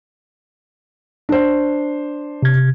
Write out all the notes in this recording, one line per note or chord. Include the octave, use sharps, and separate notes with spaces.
D4 C5
C3 G#6